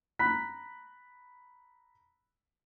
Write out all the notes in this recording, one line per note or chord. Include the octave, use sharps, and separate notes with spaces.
A#5 B5 F#6 B6